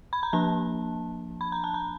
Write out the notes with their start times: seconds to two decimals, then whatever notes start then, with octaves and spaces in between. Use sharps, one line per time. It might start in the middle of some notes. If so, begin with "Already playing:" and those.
0.13 B5
0.23 A#5
0.33 F3 A#3 D4 A5
1.41 B5
1.52 A#5
1.64 A5
1.74 A#5